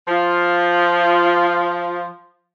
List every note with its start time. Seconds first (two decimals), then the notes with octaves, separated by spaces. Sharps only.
0.08 F3 F4